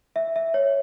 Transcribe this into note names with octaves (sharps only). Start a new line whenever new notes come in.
E5
E5
C#5